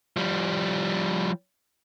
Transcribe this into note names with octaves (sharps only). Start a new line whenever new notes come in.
F3 G3